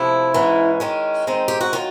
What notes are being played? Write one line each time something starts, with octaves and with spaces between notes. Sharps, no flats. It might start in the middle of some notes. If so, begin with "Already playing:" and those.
Already playing: C3 F3 A3 E4
G#2 E3 G#3 C#4
D#3 G#3 C#4
D#3 G#3 C4 D#4
G4
F#4
D#3 F#3 A#3 F4